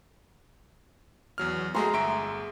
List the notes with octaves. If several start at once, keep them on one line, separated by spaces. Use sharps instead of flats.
E2 F#3 F6
G#3 A3 F#4 G#4 A#5 C6
G1 E5 C#6 D7